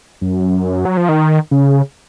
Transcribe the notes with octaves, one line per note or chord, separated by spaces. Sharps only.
F#2
F#3
F3
D#3
C#3